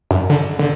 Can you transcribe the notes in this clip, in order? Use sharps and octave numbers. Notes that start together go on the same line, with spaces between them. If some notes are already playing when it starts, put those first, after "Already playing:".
F#2
D3
D3